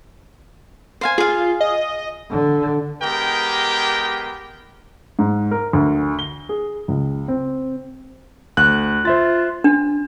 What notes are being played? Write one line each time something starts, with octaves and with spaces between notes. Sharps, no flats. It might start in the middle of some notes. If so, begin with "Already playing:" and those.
C5 F5 G#5
F4 G#4 F5
D#5
D3
G#3 B3 G4 A#4 G5
G#2
A#4
D2
G7
G#4
C#2
C4
D2 F#6
F4 C5 E5 A6
D4